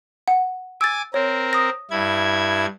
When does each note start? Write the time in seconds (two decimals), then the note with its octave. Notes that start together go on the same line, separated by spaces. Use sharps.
0.28 F#5
0.81 G#5 D6 E6 A6
1.14 C4 A#4 C#5
1.53 D#6 A#6
1.91 G2 E4 G#6